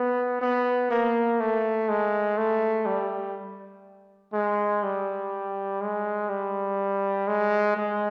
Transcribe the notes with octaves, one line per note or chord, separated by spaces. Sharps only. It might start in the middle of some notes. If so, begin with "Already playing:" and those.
Already playing: B3
B3
A#3
A3
G#3
A3
G3
G#3
G3
G#3
G3
G#3
G#3